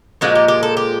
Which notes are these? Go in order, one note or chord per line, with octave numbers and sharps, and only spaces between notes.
A#2 F3 G#3 F#4
G4
G4
A4
G4